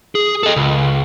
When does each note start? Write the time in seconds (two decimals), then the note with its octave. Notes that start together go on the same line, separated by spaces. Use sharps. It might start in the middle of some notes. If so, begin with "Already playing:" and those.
0.15 G#4
0.43 A4 D#5
0.56 C#2